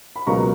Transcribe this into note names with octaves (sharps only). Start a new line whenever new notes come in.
B5
C#2 B2 F#3 A#3 A#5 C#6